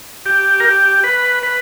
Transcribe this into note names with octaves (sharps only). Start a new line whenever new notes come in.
G4
A#4
G4
B4
B4